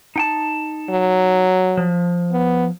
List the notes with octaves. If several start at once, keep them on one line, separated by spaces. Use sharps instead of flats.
D#4 G5 A5
F#3
F3
B3